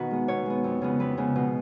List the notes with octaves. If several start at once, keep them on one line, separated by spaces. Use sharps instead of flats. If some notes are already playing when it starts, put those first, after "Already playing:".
Already playing: B2 D#3 D#4 F#4 B4
G#3 B3
B2 C#5
G#3 B3
F2
C#3 G#3 B3
F2 B4
C#3 G#3 B3
B2